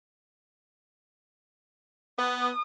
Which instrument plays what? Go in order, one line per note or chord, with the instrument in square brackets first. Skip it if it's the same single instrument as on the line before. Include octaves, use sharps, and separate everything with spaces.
[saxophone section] B3 [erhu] D#6